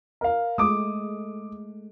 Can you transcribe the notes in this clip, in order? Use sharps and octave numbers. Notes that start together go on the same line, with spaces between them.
A#4 F5
G#3 A3 D6 D#6